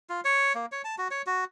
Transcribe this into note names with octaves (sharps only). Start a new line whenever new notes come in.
F4
C#5
A#3
C#5
A5
F#4
C#5
F#4